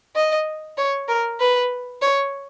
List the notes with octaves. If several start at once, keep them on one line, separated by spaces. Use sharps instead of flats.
D#5
C#5
A#4
B4
C#5